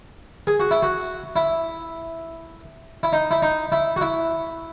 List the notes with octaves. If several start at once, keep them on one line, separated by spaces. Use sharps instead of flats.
G#4
F#4
E4
F#4
E4
E4
D#4
E4
D#4
E4
F#4
E4